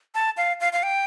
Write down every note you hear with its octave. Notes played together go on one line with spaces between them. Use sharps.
A5
F5
F5
F5
G5